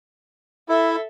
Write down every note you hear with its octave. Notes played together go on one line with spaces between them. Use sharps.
E4 A4 E5